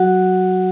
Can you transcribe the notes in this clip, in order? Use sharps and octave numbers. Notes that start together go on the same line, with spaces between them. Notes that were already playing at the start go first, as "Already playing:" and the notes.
Already playing: F#3 F#4 F#5
F#3